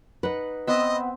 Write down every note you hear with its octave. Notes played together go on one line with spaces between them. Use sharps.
D#4 B4 F#5
B3 C4 D#5 E5